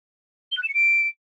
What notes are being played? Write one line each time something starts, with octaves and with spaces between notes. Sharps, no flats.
G7
F#6
E7
C#7
D7